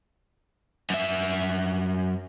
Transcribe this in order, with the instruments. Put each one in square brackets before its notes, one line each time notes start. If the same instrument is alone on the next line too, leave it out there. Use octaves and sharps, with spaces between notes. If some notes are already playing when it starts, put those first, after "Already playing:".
[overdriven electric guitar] F#2 E5